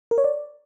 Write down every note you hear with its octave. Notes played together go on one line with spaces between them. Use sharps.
A#4
C#5
D5